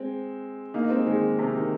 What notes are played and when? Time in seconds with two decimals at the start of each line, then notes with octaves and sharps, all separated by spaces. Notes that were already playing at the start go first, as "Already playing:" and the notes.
Already playing: G#3 C4
0.74 A#3 D#4
0.85 D#4
0.90 G#3 C4
1.07 D#3 G#3
1.39 C3
1.55 D#3